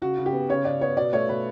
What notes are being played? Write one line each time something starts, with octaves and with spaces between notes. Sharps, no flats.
C#3 F#4
C#3
G4
B3
C#3 C#5
C#3 D5
B3 C#5
B2 D5
A3 C#5
B2 B4